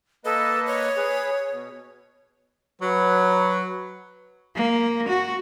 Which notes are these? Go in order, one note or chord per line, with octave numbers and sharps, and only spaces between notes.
A#3 A4 B4 D#5
C#5
G#4 B4
B2
F#3 B4
A#3
F#4